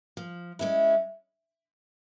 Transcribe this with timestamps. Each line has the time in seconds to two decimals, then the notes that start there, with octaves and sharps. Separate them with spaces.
0.17 F3
0.59 G#3 C#4 E4